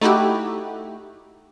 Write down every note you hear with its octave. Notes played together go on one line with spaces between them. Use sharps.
A3 D#4 E4 F#4 G4